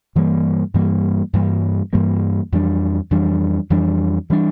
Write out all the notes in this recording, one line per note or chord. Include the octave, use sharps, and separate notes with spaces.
G2 E3 G3 A#3
G2 E3 G3 A#3
G2 E3 G3 A#3
G2 E3 G3 A#3
F2 E3 G3 D4
F2 E3 G3 D4
F2 E3 G3 D4
E3 G3 D4